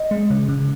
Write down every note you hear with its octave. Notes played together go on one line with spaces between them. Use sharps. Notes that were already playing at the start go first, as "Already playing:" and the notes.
Already playing: D#5
G#3
C#3
C#3